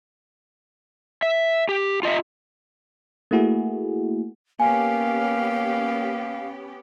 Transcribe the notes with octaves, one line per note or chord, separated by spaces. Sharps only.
E5
G4
F4 D#5 E5
A3 A#3 E4 F#4 G#4
A#3 B3 C#4 G4 F5 G#5